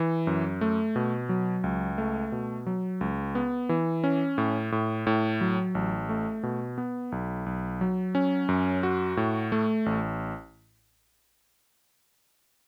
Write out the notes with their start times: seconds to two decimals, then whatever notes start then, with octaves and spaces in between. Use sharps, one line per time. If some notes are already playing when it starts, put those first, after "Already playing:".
Already playing: E3
0.27 F#2
0.61 A3
0.96 B2
1.29 F#3
1.64 C#2
1.98 A3
2.32 B2
2.66 F#3
3.01 C#2
3.35 B3
3.69 E3
4.04 C#4
4.38 A2
4.72 A2
5.07 A2
5.41 F#3
5.75 A1
6.09 A3
6.43 B2
6.78 B3
7.12 B1
7.46 B1
7.81 F#3
8.15 C#4
8.49 F#2
8.83 F#4
9.17 A2
9.52 A3
9.86 A1